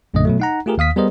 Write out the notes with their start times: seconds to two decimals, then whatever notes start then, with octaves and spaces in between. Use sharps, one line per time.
0.14 A#1 F#2 A#2 D3 A3 D#5
0.25 B2 F#3 A3
0.40 D#4 F#5 A#5
0.66 A3 F4 G4 G#4 A#4
0.78 D#2 F5 D#6 B6
0.96 G3 B3 G#4 A#4 C5 D#5